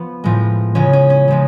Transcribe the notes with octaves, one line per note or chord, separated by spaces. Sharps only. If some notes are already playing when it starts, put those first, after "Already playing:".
Already playing: F3 B3
A2 F3 G#3
C#3 F3 G#3 C#4
C#4
C#4
C#3 F3 G#3